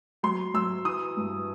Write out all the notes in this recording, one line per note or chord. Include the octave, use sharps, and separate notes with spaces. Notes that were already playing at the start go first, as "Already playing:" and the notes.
F#3 C6
F#3 E6
E3 D#6
G2